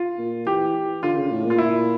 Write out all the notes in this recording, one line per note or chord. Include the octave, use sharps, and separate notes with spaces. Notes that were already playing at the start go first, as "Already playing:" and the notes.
Already playing: F4
A#2
E3 G4
D3 F4
C#3
A2
A#2 F4
E4